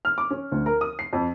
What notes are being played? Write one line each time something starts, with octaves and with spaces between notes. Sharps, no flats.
F6
D6
C#4
D2
A#4
D#6
C7
F2